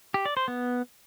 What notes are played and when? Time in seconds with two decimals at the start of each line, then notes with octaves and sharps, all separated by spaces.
0.14 G4
0.25 D5
0.37 C5
0.48 B3